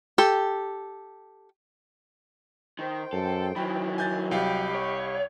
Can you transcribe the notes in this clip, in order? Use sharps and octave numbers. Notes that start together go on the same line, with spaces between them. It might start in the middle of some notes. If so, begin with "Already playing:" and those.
G4 A4
D#3 C5 G5
F#2 A4
D#3 E3 F#3 B5
G#5 G6 A6
C2 G4 D#5 F5 G5 B5
C#5